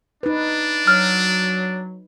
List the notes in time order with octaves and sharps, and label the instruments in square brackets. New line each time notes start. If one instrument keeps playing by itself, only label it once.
[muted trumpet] D4 [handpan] D#4 B4
[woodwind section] F#3 [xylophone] F6